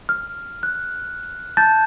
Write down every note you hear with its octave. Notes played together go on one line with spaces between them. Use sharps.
F6
F#6
A5 G6 A6